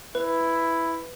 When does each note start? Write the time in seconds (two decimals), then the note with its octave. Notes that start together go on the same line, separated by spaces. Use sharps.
0.15 E4 B4